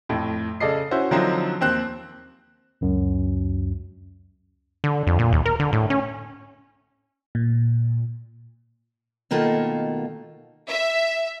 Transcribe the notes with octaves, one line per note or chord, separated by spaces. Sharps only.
F2 A2
C#3 A4 D5 D#5 C7
C#4 E4 F#4 C5
D3 F3 F#3 C4 D#4
D#2 C4 F#6
C#2 F#2
D3
F2
A#2
D#2
A#4
D3
A2
C#4
A#2
B2 D#3 A3 A#3 F4 A5
E5